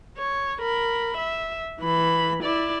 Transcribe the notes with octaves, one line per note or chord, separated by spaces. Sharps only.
C#5
A#4 B5
E5
E3 B5
E4 D5